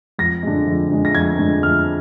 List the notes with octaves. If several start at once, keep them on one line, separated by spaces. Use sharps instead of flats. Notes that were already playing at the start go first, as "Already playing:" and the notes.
F2 A#6
D3 G#3
F2
D3 G#3
A#6
F2 G#6
D3 G#3
F2 F6